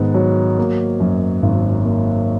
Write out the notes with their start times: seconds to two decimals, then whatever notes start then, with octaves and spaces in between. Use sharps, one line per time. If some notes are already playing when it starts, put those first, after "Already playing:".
Already playing: G#2 D#3 B3
0.14 F#3
0.58 A#3
1.00 F#2
1.42 G#1
1.85 A#3